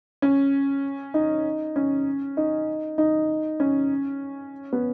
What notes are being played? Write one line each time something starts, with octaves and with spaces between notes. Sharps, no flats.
C#4
D#4
C#4
D#4
D#4
C#4
B3